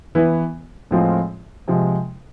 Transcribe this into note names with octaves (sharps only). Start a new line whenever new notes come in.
E3 B3 E4 B4
A2 F3 G#3 C4 F4
C3 F3 G#3